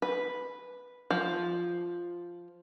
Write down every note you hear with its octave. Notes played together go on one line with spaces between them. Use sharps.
B4
F3